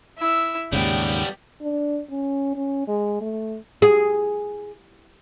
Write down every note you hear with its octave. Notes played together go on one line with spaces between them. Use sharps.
E4 E6
D#2 G#2 C#3 G3 B3 G5
D4
C#4
C#4
G#3
A3
G#4